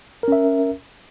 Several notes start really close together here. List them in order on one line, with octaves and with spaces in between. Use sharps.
A#4 C#4 E5